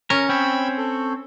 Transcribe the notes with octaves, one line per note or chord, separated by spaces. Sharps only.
C#4 A#4
C4 C#5 G5 B5 E6
A4